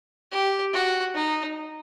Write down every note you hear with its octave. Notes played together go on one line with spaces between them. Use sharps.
G4
F#4
D#4